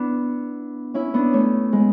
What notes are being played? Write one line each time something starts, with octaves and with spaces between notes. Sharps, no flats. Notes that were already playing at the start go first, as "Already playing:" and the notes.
Already playing: B3 D4 E4
C#4 E4
B3 D4
A3 C#4
G#3 B3